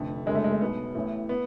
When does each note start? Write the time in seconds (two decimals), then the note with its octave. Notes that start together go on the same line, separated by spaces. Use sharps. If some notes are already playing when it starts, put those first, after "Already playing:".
Already playing: F1 F2 D3 A3
0.26 F#1 F#2 D3 G#3
0.35 A3
0.44 G#3
0.52 A3
0.61 B1 B2 B3
0.95 A1 A2
1.29 B3